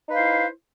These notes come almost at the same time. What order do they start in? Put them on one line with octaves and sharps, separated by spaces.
D#4 B4 F5 C5 E4